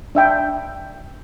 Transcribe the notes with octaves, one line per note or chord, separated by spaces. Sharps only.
D4 E5 G5